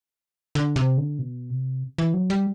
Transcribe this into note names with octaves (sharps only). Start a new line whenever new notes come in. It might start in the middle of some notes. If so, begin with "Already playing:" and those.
D3
C3
D3
B2
C3
E3
F#3
G3